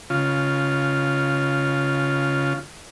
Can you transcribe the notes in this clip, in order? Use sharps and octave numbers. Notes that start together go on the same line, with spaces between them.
C#3 F4